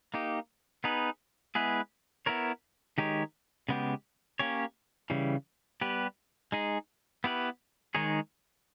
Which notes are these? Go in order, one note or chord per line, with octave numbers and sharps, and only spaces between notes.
A#3 D#4 G4
B3 D#4 G#4 B4
G#3 B3 E4 G#4 B4
B3 E4 A#4 C#5
D#3 G#3 D#4 G4 C#5
C#3 G#3 B3 G4
A#3 C#4 G4 C#5
C#3 E3 G3
G3 B3 G4 B4
G#3 D#4 G#4
B3 E4 G4 B4
D#3 G#3 D#4 G#4 C#5